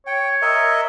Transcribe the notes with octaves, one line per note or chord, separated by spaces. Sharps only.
C#5 G5
A#4 D#5 E5